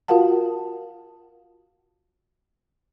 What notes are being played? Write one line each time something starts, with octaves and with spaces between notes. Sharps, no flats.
F4 F#4 A#4 F5 F#5 A5